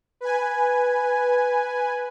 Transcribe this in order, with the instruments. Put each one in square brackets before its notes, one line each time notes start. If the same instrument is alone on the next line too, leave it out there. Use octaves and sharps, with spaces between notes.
[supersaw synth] B4 G#5